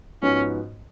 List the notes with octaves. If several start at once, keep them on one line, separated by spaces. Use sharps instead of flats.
G#2 F3 B3 C#4 F#4